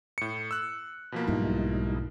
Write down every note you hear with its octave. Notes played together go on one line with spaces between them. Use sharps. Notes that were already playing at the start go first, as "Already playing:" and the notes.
A2 C#7
E6 F#6
B2 F3 A#3 B5
B1 G#2 G3 D#4 E4